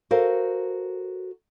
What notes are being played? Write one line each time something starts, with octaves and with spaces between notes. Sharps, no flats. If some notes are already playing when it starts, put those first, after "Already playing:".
F#4 A4 A#4 C5 F5